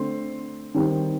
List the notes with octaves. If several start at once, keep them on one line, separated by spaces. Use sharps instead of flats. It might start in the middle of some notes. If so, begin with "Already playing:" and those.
Already playing: D3 A3 C4 C6
D#3 G3 C4